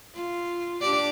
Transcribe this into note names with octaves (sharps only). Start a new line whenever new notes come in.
F4
D4 G4 D5